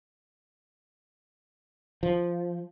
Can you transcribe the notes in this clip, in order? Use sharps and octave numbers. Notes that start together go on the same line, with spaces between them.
F3